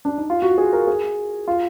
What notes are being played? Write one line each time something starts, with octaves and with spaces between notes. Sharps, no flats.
D4
D#4
F4
F#4
G#4
A#4
G#4
F4